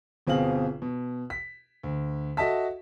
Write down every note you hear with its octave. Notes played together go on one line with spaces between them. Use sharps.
G1 B2 C4 G#4 F5 F#7
B2
B6
D2
F#4 A4 D#5 E5 A5 B6